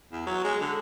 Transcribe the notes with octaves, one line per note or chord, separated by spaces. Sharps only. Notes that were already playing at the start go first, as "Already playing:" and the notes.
E2
F#3
G#3
D3